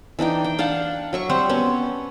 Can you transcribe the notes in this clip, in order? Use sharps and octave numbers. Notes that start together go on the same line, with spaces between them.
E3 D4 D#4 G5
G5
D4 F5 F#5 A5
F#3 E5 C#6
G3 C4 C5 F#5
B3 C#4 A5